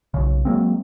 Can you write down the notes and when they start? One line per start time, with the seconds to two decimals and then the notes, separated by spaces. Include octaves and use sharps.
0.14 B1 C#3
0.45 F#3 G#3 A#3 C4